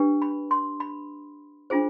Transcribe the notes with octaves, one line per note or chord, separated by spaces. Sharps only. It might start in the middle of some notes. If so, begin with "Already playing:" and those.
Already playing: D4 G4 B4
B5
C6
B5
D4 F4 G#4 C5